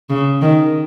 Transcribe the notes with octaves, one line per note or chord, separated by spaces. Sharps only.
C#3
D#3